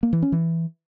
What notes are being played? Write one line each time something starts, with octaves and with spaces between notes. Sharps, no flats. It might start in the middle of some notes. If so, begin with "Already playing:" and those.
A#3
E3
C#4
E3